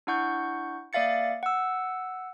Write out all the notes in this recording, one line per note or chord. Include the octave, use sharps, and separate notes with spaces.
D4 E4 F#5 C#6 G6
A#3 D5 E5 F5 A6 C#7
F#5 E6